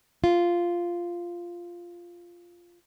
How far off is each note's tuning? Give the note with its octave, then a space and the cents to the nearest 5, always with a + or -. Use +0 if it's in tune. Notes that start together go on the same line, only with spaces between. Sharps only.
F4 -5